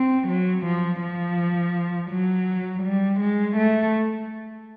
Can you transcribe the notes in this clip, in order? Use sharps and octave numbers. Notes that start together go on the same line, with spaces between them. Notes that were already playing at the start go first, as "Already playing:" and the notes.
Already playing: C4
F#3
F3
F3
F#3
G3
G#3
A3